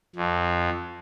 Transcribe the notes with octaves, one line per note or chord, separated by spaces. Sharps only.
F2